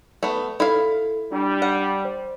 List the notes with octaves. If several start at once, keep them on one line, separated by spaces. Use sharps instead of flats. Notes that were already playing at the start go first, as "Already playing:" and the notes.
A3 B3
E4 A4 F5
G3 D4
F#5
C5